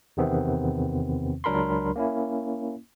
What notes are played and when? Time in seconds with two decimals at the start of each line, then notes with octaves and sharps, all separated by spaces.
0.17 E2 C3 D#3 B3 C4
1.44 C#2 F#3 D4 A#4 B5 C6
1.96 A#3 C#4 E4